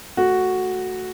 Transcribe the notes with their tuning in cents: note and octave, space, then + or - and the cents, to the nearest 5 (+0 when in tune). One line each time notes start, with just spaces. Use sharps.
A3 +0 F#4 +0